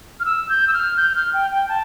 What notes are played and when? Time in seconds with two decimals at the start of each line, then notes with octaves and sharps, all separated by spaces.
0.20 F6
0.25 E6
0.49 G6
0.68 E6
0.73 F6
0.97 G6
1.16 F6
1.34 G5
1.51 G5
1.69 A5